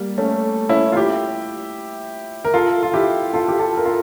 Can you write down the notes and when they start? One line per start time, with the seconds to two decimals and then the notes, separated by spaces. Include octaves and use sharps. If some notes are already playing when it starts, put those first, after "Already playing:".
Already playing: G3 A#3
0.18 A3 C#4
0.69 C#4 E4
0.92 F4
0.96 E4 G4
2.45 A#4
2.54 F4 A4
2.83 F4
2.94 E4 G4
3.34 F4 A4
3.48 G4
3.59 F4 A4
3.77 A#4
3.86 F4 A4